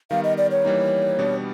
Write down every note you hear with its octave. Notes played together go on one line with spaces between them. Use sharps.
D#3 G3 B3 F5
D#5
D5
C#5
E3 G3 A#3 D#4
B2 G3 B3 D4